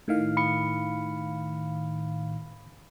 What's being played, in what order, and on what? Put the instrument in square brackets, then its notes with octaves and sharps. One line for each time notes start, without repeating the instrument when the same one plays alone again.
[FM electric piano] A2 D#3 F5
[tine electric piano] B5 C#7